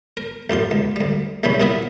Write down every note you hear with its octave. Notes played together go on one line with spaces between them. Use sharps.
A#4
A1 F#2 F4 C6
C#2
D2 G3
A#1 C3 E3 G3 C#4 B5
C2 A#2 B3 E4 A#4 B5